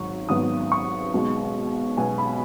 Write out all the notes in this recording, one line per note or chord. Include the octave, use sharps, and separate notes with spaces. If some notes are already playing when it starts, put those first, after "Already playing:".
Already playing: G#1 G#2 F#3 C#6
G#1 G#2 F#3 B3 D#6
C#6
B1 B2 G#3 B3
B1 B2 G#3 B3 G#5
B5